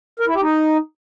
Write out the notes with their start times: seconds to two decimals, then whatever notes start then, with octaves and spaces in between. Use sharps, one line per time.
0.20 A#4
0.27 E4
0.35 G4
0.42 D#4